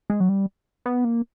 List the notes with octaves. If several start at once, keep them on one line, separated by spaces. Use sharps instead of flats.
G#3
F#3
G3
B3
A#3